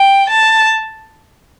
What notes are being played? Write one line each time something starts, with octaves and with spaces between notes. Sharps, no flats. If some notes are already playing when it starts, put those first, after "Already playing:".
Already playing: G5
A5